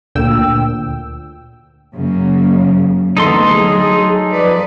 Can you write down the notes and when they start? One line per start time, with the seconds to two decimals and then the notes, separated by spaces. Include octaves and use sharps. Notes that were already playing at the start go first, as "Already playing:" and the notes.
0.15 D2 A#2 G5 E6
1.94 F#2 C#3 A#3
3.17 D2 E3 B3 D#4 A4 C6
3.51 F#3 G#4
4.30 F3 B4 D5